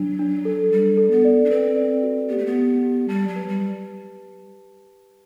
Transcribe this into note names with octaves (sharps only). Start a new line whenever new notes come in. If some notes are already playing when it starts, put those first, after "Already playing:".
Already playing: F#3 D4
D4
A4
G3 A4
A4
B3
D5
D4
C4 B4
D5
F#4
B3 G4
A3
B3
G4
G4
G3 A5
F#3
B4
G3